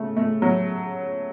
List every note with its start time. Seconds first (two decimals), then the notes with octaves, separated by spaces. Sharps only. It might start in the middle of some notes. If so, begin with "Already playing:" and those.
Already playing: C#3 A3
0.17 A3
0.42 F#3